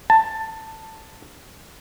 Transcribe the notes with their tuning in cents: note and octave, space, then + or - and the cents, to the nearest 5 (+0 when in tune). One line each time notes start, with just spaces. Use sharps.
A5 +10